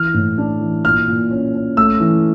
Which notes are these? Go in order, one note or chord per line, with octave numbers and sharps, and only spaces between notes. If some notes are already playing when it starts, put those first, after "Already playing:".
Already playing: E3 F6
A2
D4
E3
A#2 F6
A#2
C#4
C#4
A3 E6
E3